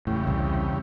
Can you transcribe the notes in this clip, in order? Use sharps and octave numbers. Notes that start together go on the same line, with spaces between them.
E2 A2 C#3 G4
C2